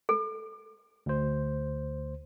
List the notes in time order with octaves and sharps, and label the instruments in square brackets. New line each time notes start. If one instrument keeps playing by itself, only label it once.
[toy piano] A4
[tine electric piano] D2 C5